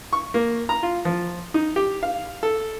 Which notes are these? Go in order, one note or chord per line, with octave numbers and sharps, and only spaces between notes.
C#6
A#3
A#5
F4
F3
D#4
G4
F5
A4